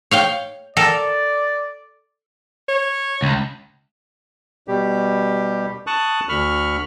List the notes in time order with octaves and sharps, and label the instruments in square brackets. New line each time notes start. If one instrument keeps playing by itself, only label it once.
[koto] C#5 F5 G5
[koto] A4 A#4 [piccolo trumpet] D5
[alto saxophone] C#5
[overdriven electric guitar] C#2
[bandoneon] B2 G3 G4
A5 C#6 D#6 F#6
D2 B5 C#6 F6